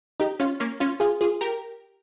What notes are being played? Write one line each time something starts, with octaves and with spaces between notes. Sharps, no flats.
D#4 G4
C#4 F4
A#3 C#4
C#4 F4
F4 G#4
F4 G#4
G4 A#4